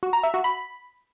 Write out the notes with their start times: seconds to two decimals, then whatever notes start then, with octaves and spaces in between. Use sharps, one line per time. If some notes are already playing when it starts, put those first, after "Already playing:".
0.03 F#4
0.13 A#5
0.23 E5
0.34 F#4
0.44 B5